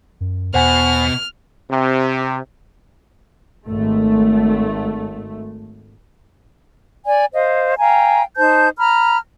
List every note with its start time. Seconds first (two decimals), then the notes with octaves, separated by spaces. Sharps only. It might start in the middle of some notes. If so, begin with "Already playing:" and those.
0.21 F#2
0.54 E2 B2 C5 F#5 G#5 F6
1.71 C3
3.68 G#1 A3
7.06 D5 G#5
7.33 C5 D#5 F5
7.78 F5 G5 G#5 A#5
8.37 D#4 C5 A5 G6
8.77 A#5 B5 F6